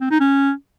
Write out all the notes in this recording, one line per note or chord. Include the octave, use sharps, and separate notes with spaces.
C4
D#4
C#4